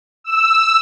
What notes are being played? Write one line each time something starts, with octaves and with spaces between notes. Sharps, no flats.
E6